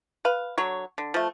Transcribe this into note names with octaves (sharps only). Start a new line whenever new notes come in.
B4 F5
D3 F#3 C#5
D3
F3 A3